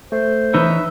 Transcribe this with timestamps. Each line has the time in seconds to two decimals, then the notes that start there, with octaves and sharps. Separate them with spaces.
0.12 A3 C5
0.54 E3 D#4 B4 C#5 E5